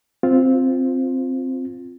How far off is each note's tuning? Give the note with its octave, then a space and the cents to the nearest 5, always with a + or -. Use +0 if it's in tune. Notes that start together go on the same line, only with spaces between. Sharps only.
C4 +0 F4 +0